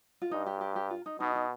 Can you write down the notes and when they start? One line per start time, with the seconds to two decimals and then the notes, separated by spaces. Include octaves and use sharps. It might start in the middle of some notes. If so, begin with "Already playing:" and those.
0.22 F4
0.31 G2 D#4
0.46 G4
0.61 G4
0.76 G4
0.90 F4
1.06 D#4
1.20 B2 D#4
1.35 D#4